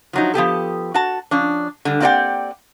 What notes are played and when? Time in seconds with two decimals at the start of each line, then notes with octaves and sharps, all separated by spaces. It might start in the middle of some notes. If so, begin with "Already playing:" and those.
0.13 F3 F#3 D#4
0.34 F3 B3 G4 A4
0.94 F#4 A5
1.31 F3 C#4 D4
1.85 D3 G3
2.00 A#3 C4 G4 D5 F#5 G5